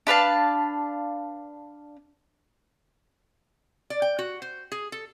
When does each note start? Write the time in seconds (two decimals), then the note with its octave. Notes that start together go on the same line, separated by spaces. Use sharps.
0.07 D4 B4 F5 A5
3.90 D5
4.02 G5
4.19 F#4
4.42 C5
4.72 G#4
4.92 A4